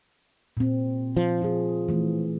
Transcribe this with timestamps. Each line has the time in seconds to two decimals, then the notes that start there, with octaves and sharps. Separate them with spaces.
0.57 A#2 C4
1.17 F3
1.42 F4 G#4
1.89 E3 A3